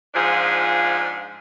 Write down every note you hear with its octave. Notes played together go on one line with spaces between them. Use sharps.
G#2 F3 D4 F4 G#4